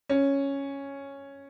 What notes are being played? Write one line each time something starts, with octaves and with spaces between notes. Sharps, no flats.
C#4